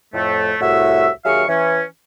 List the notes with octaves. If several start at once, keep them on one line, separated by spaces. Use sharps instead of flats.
F2 A2 A3
C2 A2 F#4 E5
D#2 F#3 G#4 E5 F5 C#6
E3 C#4